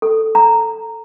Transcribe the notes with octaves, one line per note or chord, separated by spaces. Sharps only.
A4
A#5